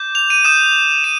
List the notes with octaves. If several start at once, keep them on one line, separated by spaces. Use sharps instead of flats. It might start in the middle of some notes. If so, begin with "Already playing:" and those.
Already playing: D6 G6
F7
D#7
D#6 G6 E7
D#7